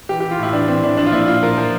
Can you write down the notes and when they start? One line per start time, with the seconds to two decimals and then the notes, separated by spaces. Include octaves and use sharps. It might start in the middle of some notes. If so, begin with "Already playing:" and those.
0.09 E3 G4
0.20 E3 G4
0.31 F4
0.39 A2 E4
0.53 E3 D4
0.68 E3 C4
0.83 E3 D4
0.97 F3 D4
1.06 F4
1.12 A#2 E4
1.27 A#2 F4
1.42 F3 A#4
1.58 F3